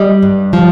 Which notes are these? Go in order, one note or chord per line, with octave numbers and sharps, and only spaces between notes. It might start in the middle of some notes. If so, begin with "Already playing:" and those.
Already playing: G3 D#5
G2
F3